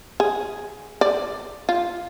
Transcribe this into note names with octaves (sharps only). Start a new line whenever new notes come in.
G#4
D5
F4